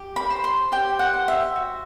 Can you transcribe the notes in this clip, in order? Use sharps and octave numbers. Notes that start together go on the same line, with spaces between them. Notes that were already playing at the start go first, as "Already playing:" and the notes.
Already playing: G4
B5
C5
C6
G4 G5
F#5
C5
E5
F#4